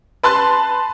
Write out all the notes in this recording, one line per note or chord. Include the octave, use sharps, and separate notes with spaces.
B4 A5 C6 F#6